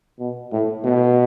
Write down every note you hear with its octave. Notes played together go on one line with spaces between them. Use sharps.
B2
A2
B2